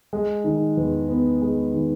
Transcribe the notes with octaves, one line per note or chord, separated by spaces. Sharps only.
G#3
D#3
E2
B3
G#3
D#3